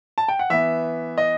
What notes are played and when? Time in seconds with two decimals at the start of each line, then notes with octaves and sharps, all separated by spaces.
0.18 A5
0.28 G5
0.39 F#5
0.50 E3 B3 E5
1.18 D#5